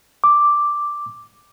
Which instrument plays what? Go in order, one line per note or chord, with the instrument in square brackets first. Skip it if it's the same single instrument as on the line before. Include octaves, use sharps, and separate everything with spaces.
[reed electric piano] D6